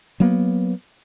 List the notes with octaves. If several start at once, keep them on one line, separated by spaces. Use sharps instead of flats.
F#3 A#3 B3